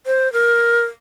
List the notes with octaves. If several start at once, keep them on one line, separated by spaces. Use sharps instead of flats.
C5
A#4